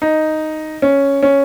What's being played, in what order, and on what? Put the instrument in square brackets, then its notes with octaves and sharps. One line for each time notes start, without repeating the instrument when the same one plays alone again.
[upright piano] D#4
C#4
C#4